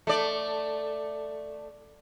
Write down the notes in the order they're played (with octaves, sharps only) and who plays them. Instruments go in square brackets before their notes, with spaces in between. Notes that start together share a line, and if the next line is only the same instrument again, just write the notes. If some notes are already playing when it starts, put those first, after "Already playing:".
[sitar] A3 D5